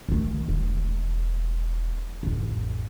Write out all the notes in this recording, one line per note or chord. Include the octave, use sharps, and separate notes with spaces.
D#3 A3
E1
A1 F2